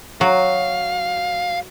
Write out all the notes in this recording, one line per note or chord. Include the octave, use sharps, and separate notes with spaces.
F#3 F5